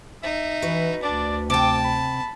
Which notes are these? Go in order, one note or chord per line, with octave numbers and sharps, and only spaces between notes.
D#4 E5
E3 F#4 B4
D2 D4 D5
C3 G5 A5 D6
B5